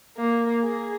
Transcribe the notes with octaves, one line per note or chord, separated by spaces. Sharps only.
A#3
G#4